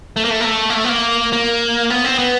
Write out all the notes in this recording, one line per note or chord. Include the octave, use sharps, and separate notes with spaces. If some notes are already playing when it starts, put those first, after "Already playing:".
A3
A#3
A3
A#3
A3
A#3
A3
B3
A#3
A#3
B3
C4
B3